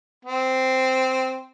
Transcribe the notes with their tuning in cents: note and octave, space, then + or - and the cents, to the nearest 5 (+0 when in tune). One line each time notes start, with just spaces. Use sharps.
C4 -5